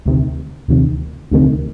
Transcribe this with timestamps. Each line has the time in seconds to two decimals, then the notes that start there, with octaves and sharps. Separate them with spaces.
0.06 D2 C3 D#3
0.68 D2 C3 D#3
1.32 D2 C3 D#3